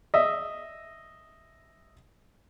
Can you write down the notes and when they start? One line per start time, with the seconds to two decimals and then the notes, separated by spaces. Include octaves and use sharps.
0.14 D#5 E5